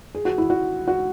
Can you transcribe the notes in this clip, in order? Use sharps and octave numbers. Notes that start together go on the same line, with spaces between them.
G#4
F#4
E4
F#4
F#4